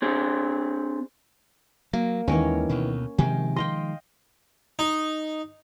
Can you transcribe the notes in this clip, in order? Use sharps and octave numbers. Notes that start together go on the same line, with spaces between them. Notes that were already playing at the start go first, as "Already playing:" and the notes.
C4 D4 G#4 C5
F#3 A#3
D#2 D#3 E3 G#3 C#4 A#4 C#5
D2 B2
C3 D#3 F3 G#3 G5 G#5
D#5 F5 G5 C6
D#4